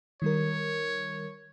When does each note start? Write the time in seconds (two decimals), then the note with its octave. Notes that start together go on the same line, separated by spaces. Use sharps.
0.22 D#3 G3 A#4 C#5